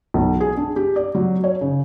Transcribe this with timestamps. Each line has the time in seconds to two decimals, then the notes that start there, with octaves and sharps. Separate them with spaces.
0.14 B1
0.40 G#4
0.57 D4
0.76 G4
0.96 D5
1.15 F#3
1.44 C#5
1.61 C#3